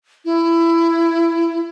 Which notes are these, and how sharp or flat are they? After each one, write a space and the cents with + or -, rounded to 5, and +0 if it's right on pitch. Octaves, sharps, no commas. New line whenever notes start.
E4 +20